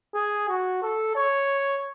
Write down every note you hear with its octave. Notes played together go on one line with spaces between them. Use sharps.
G#4
F#4
A4
C#5